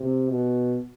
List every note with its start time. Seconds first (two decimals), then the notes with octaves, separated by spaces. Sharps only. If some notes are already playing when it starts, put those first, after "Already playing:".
Already playing: C3
0.28 B2